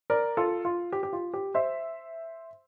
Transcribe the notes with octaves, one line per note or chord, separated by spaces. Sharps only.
A#4 D5
F4 A4
F4
G4
G4
F4
G4
C5 E5